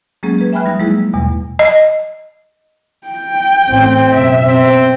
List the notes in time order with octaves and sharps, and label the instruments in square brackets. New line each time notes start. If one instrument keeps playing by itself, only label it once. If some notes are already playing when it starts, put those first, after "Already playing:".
[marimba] F#3 G#3 A#3 C#4 G#4
G#4 B4
E5 G5 G#5 B5 F6 F#6
F3 G3 D#4
F#3 G#3 A#3 E4 G#4
E2 B2 G3
[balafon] D#5
[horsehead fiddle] G5
[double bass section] A1 [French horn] C4
[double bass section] F#1 B2 [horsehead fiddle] E5
[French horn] C4